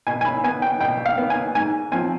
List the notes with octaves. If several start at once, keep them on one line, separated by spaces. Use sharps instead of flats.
B2 G#5
G#5
B5
B3 G#5
G5
B2 G5
F5
B3
G#5
G#2 G#5
F3 C4 G#5